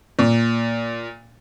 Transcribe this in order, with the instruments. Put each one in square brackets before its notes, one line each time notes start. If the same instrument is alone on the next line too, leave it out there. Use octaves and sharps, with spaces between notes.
[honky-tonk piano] A#2